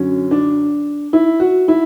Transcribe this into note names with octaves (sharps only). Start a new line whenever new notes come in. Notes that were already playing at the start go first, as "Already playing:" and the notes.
Already playing: F#2 D3 F#3 C#4
D4
E4
F#4
E4